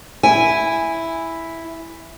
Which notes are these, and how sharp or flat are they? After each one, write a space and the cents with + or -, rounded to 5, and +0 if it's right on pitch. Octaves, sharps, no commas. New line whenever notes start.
E4 +0 G#5 -10